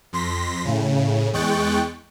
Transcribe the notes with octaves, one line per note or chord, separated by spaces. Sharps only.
F2 C6 A#6 B6
A2 C#3
E2 G#3 G5 C#6 F#6 A6